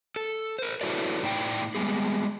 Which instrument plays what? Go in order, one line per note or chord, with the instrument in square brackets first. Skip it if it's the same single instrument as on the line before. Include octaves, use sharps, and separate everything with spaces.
[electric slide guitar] A4
A#4 C5
E4 F#4 A4 B4 C#5 D5
A2 D#4 D5 G5
G3 G#3 B3 G#4